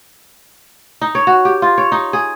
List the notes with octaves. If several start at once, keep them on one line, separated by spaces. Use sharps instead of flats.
D#4
C#5
F#4
G4
F4
C#5
D#4
G#4